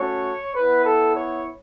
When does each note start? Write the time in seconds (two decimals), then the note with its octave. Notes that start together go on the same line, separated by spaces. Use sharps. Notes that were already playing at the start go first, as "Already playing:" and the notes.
Already playing: A3 C#4 F#4 C#5
0.55 B3 E4 B4
0.85 A4
1.15 C#5